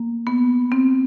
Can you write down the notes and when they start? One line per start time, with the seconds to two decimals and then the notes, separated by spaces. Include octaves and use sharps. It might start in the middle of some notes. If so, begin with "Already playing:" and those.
Already playing: A#3
0.27 B3
0.72 C4